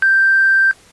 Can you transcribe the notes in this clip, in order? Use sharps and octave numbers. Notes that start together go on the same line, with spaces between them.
G6